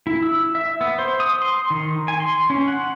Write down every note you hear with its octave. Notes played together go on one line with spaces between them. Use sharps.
E4
E6
E5
B3
C5
D#6
C6
D#3
G#5
C6
C#4
F#5